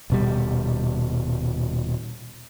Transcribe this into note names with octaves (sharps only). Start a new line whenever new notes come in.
D#1 B2 G3